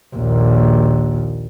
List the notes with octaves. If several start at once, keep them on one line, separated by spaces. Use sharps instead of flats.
A#1 D#2